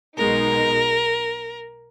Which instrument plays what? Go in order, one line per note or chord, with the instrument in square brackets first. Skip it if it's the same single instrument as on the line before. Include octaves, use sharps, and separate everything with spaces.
[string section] B1 B2 G#3 D#4 [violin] A#4